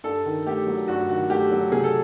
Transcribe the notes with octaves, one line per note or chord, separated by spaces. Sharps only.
G2 A4
D#3
A3 G4
F#3
G2 F#4
D#3 F#4
A3 G4
F#3
C3 G#4
A4